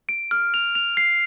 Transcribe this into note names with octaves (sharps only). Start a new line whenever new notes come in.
D7
F6
F7
F7
C7